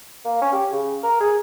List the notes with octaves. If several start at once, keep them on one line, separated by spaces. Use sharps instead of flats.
A#3
C#4
G4
C#3
A#4
G#4